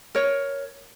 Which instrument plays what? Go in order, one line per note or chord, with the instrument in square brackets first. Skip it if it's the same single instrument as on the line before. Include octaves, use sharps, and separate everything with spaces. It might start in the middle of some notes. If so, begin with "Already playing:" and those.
[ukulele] A#4 C#5